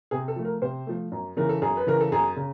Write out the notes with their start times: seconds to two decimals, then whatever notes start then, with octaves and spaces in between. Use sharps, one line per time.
0.11 C3 G#4
0.28 A4
0.36 F3 A3
0.45 A#4
0.62 C3 C5
0.87 F3 A3
1.12 F#2
1.37 C#3 E3 A#4
1.49 A4
1.62 F#2 G#4
1.77 B4
1.87 C#3 E3 A#4
2.00 A4
2.12 F#2 G#4
2.36 C#3